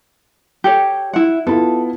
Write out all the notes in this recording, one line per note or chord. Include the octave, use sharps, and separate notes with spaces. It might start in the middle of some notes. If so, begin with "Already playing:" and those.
G4 A4 C#5
E4 F#5
B3 E4 F4 A4